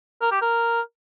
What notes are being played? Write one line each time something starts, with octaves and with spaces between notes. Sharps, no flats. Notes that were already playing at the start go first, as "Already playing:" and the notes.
A#4
G4
A#4